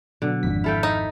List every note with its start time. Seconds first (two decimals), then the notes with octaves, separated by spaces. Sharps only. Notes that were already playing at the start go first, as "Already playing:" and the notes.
0.22 B2 D3 F#3
0.43 G#1 F2 B6
0.64 E4 A4 F5 G5
0.83 D#4